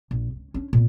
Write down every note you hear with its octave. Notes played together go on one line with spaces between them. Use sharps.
A#1
C#2
C#4 D4
A#2 B3